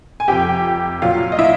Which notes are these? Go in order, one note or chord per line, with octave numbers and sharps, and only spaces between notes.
G#5
F2 C3 F3 G4 G5
A#2 F#3 F4 F5
D#5
E4 E5